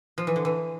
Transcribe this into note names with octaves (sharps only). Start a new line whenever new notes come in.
F3
E3
D3
E3